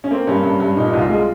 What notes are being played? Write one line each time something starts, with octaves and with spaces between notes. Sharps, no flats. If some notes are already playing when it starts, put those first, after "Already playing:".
C#4
A#3 C4
G2 C#4
G2
G2
A#2 D#4
D#4
C2 F4
G#3